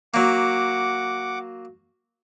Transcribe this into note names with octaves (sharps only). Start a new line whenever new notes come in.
F#3 A#3 F#5 D6